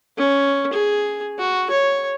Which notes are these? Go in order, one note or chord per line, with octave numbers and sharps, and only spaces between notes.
C#4
G#4
F#4
C#5